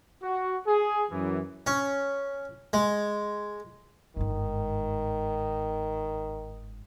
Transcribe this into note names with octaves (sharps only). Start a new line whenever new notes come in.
F#4
G#4
F#2 E3
C#4
G#3
G1 G#2 D#3